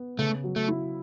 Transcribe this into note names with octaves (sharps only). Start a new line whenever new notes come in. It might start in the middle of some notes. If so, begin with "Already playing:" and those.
Already playing: B3
C#3 A3
F#3
A3
E4